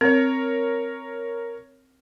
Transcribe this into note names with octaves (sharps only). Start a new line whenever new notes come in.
C4 A#4 C#5